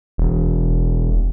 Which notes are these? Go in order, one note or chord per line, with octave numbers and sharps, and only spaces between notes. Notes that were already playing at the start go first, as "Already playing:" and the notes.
E1